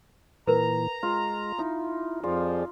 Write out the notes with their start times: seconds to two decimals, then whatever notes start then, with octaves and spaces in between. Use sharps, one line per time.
0.47 A#2 E3 A#4 B4 A#5
1.03 G#3 F4
1.59 D#4 E4
2.24 F2 F3 F4 G#4 D5